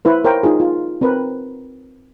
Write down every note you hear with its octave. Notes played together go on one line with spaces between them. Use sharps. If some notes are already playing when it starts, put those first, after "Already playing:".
E4 B4 C5
A#4 C5 C#5 F5 G5 A#5
D#4 F4 G#4
F4
C4 A#4 B4